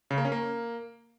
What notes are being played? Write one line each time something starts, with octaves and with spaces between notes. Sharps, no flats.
C#3
A#3
C#4
A#3